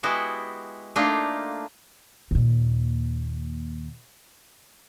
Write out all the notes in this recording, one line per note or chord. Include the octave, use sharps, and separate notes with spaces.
G#3 B3 E4 F#4 G4
A3 A#3 D4 D#4 F4
D#2 A#2